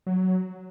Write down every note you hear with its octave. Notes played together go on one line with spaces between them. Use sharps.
F#3